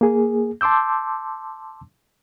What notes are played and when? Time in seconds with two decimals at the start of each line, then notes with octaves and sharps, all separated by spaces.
0.01 A#3 G#4
0.61 A5 C6 D6 E6 G6